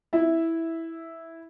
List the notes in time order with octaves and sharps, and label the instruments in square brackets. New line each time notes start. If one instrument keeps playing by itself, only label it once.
[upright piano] E4 E5